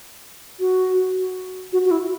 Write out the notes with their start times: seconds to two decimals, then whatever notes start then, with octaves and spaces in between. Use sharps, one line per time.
0.60 F#4
1.73 F#4
1.85 F#4
1.91 E4